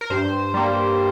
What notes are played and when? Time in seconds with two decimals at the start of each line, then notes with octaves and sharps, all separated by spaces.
0.01 A#4
0.10 G2 C5
0.54 G3 A#3